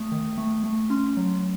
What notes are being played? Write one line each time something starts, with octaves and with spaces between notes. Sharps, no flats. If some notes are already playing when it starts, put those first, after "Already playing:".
Already playing: A3 D#6
D#3
A3
A3
C#4 C6
F#3